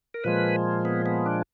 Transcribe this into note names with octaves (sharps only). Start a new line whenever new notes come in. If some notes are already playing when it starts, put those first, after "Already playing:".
A#4
A#2 F3 G#3 B4
B3
B3
D4